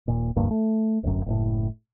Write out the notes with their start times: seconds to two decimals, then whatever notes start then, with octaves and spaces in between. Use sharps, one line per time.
0.08 D#1 A#2
0.36 F1 D2 G2 A#3
0.51 A3
1.03 D1 G1 F#2
1.26 F#1 A2